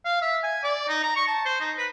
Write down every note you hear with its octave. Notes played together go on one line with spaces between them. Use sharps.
F5
E5
G#5
D5
D#4
A#5
C#6
A5
C5
D#4
B4